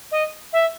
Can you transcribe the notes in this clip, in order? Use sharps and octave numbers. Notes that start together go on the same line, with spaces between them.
D#5
E5